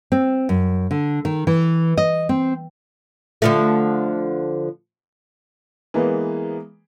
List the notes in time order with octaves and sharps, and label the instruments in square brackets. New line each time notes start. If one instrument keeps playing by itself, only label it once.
[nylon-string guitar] C4
F#2
D3
D#3
E3
D#5
C4
[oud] D3 F3 A3
[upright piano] E3 G#3 A#3 B3